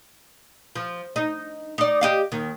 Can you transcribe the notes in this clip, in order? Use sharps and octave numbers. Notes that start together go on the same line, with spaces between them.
F3
D#4
D#4 D5
G4 D#5 F5
D#2 D#3